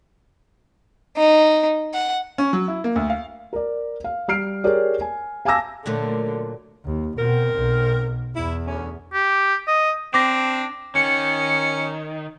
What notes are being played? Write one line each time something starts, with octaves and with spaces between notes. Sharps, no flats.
D#4
F#5
C#4
F#3
E4
A#3
D2
F5
A#4 D5
F5
G3 F6 C7 D7
G4 G#4 A#4 C#5 D5
G#5
F5 G#5 A5 D6 E6 A#6
A#2 D3 F#3 A3
D#2
B2 C4 A#4
B1
E2 E4
D2 C#4
G4
D#5
C4 D4 D6 A#6
D#3 C#4 C#7